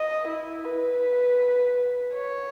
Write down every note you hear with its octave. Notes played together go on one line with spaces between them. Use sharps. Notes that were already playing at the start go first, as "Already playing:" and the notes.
Already playing: D#5
E4
B4
C#5